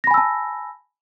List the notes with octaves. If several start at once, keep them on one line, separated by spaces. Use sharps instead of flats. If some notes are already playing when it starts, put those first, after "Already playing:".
G#5 A5 B5 E6 A#6